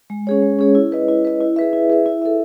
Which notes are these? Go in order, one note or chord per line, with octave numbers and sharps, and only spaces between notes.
G#3
C#4 G#4 C#5
G#3
C#4 G#4 C#5
E4
B4 D#5
E4
B4 D#5
E4
G#4 B4 E5
E4
G#4 B4 E5
E4
A4 E5